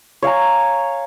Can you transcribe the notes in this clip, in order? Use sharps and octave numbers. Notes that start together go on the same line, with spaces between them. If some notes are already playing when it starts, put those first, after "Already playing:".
C#5 F5 G#5 A#5